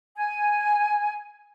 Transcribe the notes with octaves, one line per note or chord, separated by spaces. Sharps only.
G#5